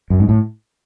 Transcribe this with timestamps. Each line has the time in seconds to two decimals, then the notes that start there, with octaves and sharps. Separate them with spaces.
0.10 F#2
0.20 G#2
0.29 A2